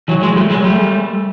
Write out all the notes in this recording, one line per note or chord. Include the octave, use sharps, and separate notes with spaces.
E3 F#3
F#3 G#3
G3 A3
F#3 G#3
G3 A3